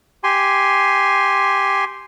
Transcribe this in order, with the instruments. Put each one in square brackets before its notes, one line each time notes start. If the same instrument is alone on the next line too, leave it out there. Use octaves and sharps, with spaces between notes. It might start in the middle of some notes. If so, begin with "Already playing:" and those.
[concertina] G4 G#5 C6